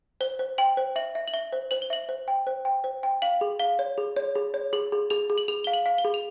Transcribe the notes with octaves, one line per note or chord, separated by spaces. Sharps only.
C5 G7
C5
G5 F#7
C5
E5 F#7
E5
F#7
E5 G7
C5
C5 F#7
G7
E5 F#7
C5
G5
C5
G5
C5
G5
F5 F#7
G#4
F5 G7
C#5
G#4
C#5
G#4
C#5
G#4 F#7
G#4
G#4 F7
G#4
F#7
G#4 F7
F5 G7
F#7
F5
G7
G#4
F7